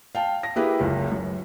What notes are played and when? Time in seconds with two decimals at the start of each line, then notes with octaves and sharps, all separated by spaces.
0.15 F5 G5 A5
0.43 A#6
0.56 A#3 E4 G4 G#4 B4
0.80 F#1 C#2
1.12 F#2